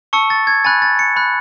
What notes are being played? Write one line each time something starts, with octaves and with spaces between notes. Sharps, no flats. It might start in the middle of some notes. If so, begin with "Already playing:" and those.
A5 C#6 E6 C#7
A6
G#6
G#5 B5 F#6 A6
A6
C#7
B5 F#6